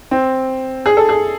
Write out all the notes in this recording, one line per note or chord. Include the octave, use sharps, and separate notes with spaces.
C4
G#4
A4
G#4